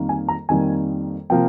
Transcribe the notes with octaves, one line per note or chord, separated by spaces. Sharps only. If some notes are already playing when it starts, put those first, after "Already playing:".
Already playing: F2 D#3 G3 A#3
G#5
A#5
F2 D#3 G3 A#3 G#5
C3 F3 A#3 G5